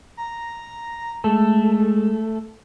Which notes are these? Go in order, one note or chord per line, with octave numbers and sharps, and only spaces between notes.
A#5
G#3 A3 A4